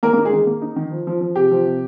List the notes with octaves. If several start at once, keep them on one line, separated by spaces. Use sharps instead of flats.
D#3 A#3 A#4
A#3 D#4 A#4
G#3 G#4
D#3
A#3
D#4
D#3
F3
F3
F3
C3 G4
F3
C3